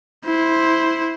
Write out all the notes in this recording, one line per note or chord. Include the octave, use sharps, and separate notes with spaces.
E4 C5